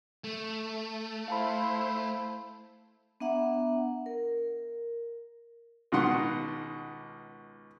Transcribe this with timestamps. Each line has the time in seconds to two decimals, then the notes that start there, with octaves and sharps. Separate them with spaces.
0.24 A3
1.28 E4 C5 F5 A5 B5
3.20 B3 D4 E5 F#5 A#5
4.06 A#4
5.92 C#2 B2 D#3 F#5 C6